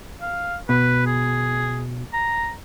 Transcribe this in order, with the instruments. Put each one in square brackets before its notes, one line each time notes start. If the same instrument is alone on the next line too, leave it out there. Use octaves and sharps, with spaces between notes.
[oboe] F5
[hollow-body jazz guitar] B2 [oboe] B4
[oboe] G#4
A#5